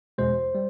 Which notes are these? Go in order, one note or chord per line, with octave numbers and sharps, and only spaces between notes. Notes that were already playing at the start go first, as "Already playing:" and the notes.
E2 B2 G#3 C5
G3